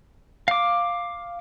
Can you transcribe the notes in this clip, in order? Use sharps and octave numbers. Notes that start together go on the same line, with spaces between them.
F5 D6